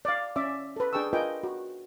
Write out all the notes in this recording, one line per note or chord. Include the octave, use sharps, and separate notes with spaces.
D5 F5
C#4 D5 E5 D6
A4 B4
D4 G#4 G5 A5 C#6 E6
F4 A#4 B4 D#5 G5 G#5
F#4